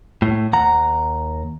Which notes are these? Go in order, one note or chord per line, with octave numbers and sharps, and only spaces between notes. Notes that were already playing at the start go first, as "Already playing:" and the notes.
A2
D#2 F#5 A#5